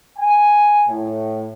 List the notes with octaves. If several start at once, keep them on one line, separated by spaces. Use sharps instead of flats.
G#5
A2